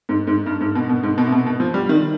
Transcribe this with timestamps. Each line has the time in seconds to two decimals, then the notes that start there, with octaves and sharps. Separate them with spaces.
0.09 G#2
0.27 G#2
0.46 G2
0.61 G#2
0.75 B2
0.89 B2
1.03 G#2
1.18 B2
1.27 C3
1.32 B2
1.47 B2
1.60 F3
1.74 G3
1.89 D#3